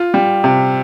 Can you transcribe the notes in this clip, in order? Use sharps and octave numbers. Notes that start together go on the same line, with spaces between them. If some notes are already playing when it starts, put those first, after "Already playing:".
Already playing: F4
G3
C3